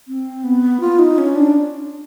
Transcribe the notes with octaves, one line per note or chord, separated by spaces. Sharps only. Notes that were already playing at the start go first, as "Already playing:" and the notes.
C4
B3
F4
D#4
C#4
D4